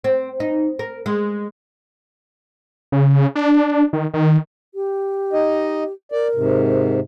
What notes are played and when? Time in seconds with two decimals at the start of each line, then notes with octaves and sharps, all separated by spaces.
0.04 C4
0.40 D#4
0.79 A#4
1.06 G#3
2.92 C#3
3.36 D4
3.93 D#3
4.14 D#3
4.74 G4
5.33 D#4 D#5
6.12 A#4 D5
6.35 G#2 C3